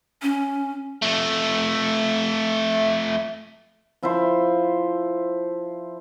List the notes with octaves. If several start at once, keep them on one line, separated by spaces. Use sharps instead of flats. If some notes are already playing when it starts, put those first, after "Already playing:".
C#4
F2 A3
F3 E4 F4 C5